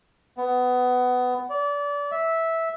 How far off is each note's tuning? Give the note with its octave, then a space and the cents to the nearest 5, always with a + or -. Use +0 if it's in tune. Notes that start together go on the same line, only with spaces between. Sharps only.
B3 +20
D5 -30
E5 -10